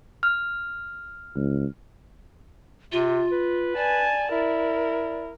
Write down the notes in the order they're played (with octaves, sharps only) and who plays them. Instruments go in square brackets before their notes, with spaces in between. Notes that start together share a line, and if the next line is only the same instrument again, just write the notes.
[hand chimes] F6
[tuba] C#2
[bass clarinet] C3 [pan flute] F4
[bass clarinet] B4
[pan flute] D5 [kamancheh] G#5 A5
[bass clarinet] E4 [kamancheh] A#4